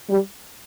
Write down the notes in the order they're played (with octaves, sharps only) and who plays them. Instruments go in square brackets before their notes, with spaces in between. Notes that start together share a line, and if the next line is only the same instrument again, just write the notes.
[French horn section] G3